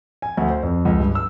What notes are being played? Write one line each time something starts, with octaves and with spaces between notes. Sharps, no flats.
G#5
D2
C5
F2
C#2
G2
E6